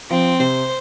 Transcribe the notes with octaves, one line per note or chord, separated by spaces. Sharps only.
F3 C4
C3 C5